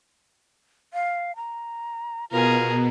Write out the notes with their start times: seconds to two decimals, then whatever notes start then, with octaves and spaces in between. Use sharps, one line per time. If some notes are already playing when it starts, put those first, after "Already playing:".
0.94 F5
1.36 A#5
2.31 B2 F4 G#4 A#4